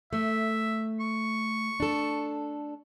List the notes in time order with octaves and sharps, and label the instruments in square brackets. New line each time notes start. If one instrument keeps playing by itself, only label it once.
[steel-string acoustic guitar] A3 [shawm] E5
[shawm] C#6
[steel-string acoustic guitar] D4 A4